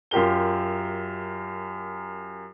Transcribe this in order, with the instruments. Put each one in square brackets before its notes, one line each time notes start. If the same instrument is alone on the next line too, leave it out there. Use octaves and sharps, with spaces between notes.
[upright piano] F#2 F4 G4 A#4 G7